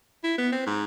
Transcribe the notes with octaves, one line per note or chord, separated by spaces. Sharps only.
E4
B3
C4
G#2